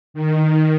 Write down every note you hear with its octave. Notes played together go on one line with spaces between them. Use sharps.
D#3